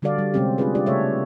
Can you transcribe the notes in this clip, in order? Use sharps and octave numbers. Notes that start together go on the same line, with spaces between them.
D3 G3 F#4 A4 D5 F5
G3
C3 G3 G#3 C4 C#4 G4
A3 C4 D4 F4 G#4 B4
D4 F4 G4 D5
C#3 A3 A4 C#5 E5